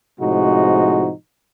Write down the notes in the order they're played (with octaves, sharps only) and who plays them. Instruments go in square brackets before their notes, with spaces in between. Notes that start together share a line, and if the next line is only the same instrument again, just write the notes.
[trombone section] A2 C3 F3 G#3 D#4 F#4